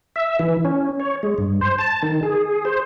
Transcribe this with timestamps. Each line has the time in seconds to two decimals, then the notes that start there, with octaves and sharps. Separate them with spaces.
0.16 E5
0.39 E3
0.65 C#4
1.00 C#5
1.23 G#3
1.38 G2
1.61 C5
1.79 A5
2.03 D#3
2.23 G#4
2.65 C5